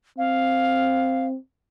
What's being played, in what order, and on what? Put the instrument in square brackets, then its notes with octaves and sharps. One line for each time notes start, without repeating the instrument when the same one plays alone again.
[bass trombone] C4 [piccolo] F5